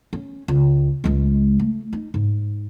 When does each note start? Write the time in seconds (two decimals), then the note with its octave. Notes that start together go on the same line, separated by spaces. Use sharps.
0.13 C#4
0.48 C#2
1.04 C#2 G#3
1.59 A3
1.93 D#4
2.14 G#2